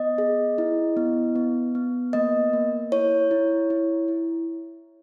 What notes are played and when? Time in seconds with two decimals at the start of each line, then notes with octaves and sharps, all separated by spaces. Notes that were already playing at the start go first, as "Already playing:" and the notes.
Already playing: B3 D#5
0.18 G#4
0.58 E4
0.97 B3
1.35 B3
1.75 B3
2.13 A#3 D#5
2.53 A#3
2.92 E4 C#5
3.31 E4
3.70 E4
4.08 E4